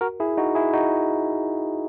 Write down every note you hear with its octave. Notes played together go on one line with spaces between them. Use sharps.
F#4 A#4
E4 G#4
D#4 F#4
E4 G#4
D#4 F#4